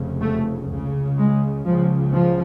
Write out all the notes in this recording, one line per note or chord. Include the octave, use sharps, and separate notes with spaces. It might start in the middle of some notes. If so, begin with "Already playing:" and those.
Already playing: F1 F2 C#3
A3
C#2 C#3
G#3
C#2 C#3 F3
F3